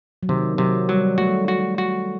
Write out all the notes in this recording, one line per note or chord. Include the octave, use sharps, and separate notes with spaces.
F#3
C3 D#3
C3 F#3
F#3 G3
A3 F#4
F#4
F#4